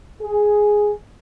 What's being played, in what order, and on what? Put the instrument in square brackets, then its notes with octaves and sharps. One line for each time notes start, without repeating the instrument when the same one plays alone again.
[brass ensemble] G#4